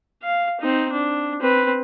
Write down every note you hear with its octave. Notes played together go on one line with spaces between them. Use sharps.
F5
C4 D#4
D4
C4 B4